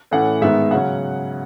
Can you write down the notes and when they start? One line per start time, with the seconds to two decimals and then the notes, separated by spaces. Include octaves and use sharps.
0.11 A2 E3 A3 C#4 F#5
0.41 G#2 D#3 G#3 B3 E5
0.71 C#3 F#3 C#4 F#5